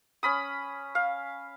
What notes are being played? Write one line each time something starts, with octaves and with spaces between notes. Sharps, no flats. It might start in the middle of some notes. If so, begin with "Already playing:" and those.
C#4 B5 D#6
F5